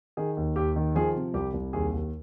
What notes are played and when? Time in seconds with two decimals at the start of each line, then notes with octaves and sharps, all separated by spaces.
0.17 D#3 G#4
0.37 D#2
0.56 D#2 G4
0.76 D#3
0.95 F3 G#4
1.15 C3
1.34 C2 G4
1.54 C2
1.73 D#2 G#4
1.92 D#2